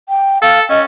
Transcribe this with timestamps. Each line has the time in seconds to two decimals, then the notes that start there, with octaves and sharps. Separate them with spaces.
0.09 G5
0.42 A4 F5
0.70 C#4 D#5